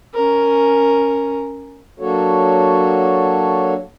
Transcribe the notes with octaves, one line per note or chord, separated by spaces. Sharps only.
C#4 A#4
F#3 A#3 D4 F#4 A4 C#5